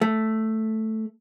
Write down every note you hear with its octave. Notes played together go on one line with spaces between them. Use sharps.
A3